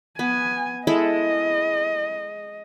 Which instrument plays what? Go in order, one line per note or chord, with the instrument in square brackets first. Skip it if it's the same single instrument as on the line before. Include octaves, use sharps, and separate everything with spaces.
[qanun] B3 [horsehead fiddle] G#5
[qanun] G#3 E4 A4 [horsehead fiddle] D#5